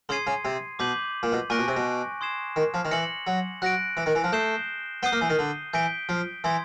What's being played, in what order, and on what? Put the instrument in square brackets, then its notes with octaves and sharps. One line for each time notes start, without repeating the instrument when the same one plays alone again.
[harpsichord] C#3 [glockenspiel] C6 D#6 G#6 C7 D#7
[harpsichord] C#3
C3
[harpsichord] B2 [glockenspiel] D6 G6 B6 D#7 F#7
[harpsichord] A#2
B2
[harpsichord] A#2 [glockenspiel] G#5 C#6 F#6 A#6 D7
[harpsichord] B2
C3
B2
[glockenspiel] C6 D#6 G#6 C7 E7
[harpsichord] D#3
F3
D#3
[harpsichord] E3 [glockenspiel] F6 A#6 C#7 F#7
[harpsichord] F#3
[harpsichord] F#3 [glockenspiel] F#6 A#6 D7
[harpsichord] E3
D#3
E3
F3
[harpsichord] A3 [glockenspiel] D#6 G6 C7 E7 G7
[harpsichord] B3 [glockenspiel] D#6 G6 C7 D#7 G7
[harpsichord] A#3
E3
D#3
D3
[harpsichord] E3 [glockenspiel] G6 B6 D7 G7
[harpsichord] F3
[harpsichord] E3 [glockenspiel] C6 D#6 G#6 B6